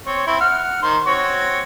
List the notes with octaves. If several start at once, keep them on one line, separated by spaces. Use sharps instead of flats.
C4 C#5
C4 E4
F#5 F6
D#3 C5 C6
C4 F#4 C#5